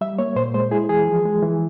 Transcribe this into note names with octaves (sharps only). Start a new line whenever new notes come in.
G3 E5
A#3 C#5
A#2 C5
G#3 C5
E4 G#4
E3 G#4
F3
G#3
E3